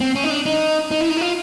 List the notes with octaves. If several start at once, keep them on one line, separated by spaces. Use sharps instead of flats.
C4
C#4
D#4
D4
D#4
D#4
E4
D#4
E4
F4